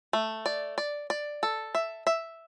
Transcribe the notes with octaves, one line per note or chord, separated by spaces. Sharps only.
A3
D5
D5
D5
A4
E5
E5